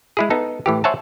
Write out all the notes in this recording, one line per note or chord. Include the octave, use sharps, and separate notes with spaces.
G#3 E4 G#4
B3 D#4 A4
A2 E3 G4
C5 C#5 E5 F#5 G#5 A5